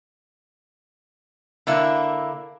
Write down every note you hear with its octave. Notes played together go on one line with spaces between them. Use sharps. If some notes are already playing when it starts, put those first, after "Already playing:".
D3 A#3 E4